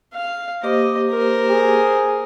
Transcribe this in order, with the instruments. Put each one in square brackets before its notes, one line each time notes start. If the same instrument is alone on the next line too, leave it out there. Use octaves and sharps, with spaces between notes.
[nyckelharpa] F5
[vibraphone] A#3 G4 D6 [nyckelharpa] C5 D#5
[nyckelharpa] A#4 C5
[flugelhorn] G#4